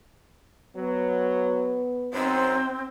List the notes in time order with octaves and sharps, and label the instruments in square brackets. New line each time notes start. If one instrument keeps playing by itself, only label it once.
[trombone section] F#3 [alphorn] B3
[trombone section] F#2 D#4 C5 [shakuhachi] C4